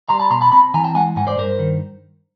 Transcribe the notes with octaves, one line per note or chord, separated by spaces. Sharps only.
G3 A#5 C6
A5 B5
B2 A#5 C6
A5 B5
C4 A5 B5
E3 G#5 A#5
G5 A5
G#3 F#5 G#5
G#2 F#5 G#5
C5 D5
G2 A#4 C5
D#3